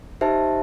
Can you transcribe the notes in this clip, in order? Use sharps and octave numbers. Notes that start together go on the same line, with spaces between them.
D#4 G4 C5 E5 A5